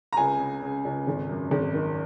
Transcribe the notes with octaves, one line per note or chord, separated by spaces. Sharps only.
A#5
C#2 G#5
C#3
C#3
C#2
G#1
F#2
G#1
D#3